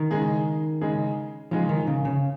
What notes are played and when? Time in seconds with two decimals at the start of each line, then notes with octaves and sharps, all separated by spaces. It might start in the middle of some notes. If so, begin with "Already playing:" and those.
Already playing: D#3
0.11 C#3 G#3 D#4 G#4
0.81 C#3 G#3 D#4 G#4
1.51 C#3 F3 G#3 D#4 G#4
1.69 D#3
1.87 C#3
2.05 C#3